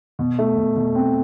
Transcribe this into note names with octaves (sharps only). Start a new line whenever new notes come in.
B2
A3
B2
B2
C4